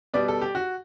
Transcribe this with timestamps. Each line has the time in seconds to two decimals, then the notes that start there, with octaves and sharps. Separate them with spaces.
0.14 B2 G3 B3 D5
0.28 A4
0.41 G4
0.55 F#4